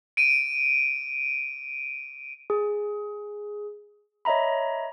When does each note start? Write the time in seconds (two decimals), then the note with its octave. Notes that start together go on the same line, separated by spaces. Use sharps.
0.17 D7 D#7
2.50 G#4
4.25 C#5 D#5 E5 A#5 B5